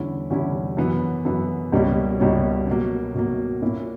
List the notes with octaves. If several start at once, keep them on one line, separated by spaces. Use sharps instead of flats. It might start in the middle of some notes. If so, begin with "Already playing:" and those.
Already playing: E2 D3 G3 C#4 E4
E2 D3 G3 C#4 E4
F#2 E3 B3
F#2 E3 B3
C#2 B2 G3 A#3 C#4
C#2 B2 G3 A#3 C#4
B2 F#3 A#3
B2 F#3 A#3
A#2 A#3 C#4 E4